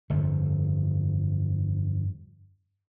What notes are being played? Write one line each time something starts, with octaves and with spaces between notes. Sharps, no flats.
G1 F2